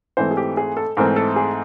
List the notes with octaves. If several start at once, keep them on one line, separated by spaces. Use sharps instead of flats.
G#2 E3 A3 C4 C5
G#4
G4
G#4
A4
G#2 E3 A3 C4 A#4
A4
G#4